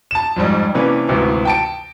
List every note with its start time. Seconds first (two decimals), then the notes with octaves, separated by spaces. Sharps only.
0.11 A5 E7
0.36 F2 G#2 G3
0.74 C3 E3 A#3 C#4 D4 B4
1.08 G#1 D2 C3 E3
1.45 G5 A5 D7